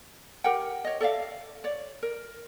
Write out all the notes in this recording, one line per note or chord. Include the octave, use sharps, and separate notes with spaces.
G4 A#4 F#5 G5
C#5 D#5
A4 D5 E5 F5
C#5 D5
A#4